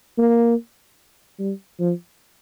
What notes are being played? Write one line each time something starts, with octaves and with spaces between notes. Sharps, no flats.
A#3
G3
F3